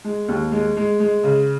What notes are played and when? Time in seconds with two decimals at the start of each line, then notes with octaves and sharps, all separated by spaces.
0.05 G#3
0.28 D#2
0.52 G#3
0.77 G#3
1.00 G#3
1.24 C#3